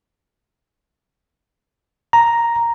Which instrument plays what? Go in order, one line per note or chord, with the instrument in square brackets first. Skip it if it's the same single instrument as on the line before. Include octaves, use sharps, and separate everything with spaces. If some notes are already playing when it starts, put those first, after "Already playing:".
[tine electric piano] A#5